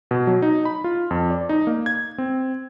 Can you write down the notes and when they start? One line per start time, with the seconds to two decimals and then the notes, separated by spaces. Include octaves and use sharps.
0.11 B2
0.27 F#3
0.42 D#4
0.65 B5
0.84 F4
1.11 F2
1.30 D5
1.49 D#4
1.67 A#3
1.86 G#6
2.18 C4